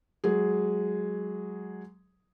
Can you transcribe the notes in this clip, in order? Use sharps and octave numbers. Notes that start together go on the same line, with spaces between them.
F#3 G#3 G#4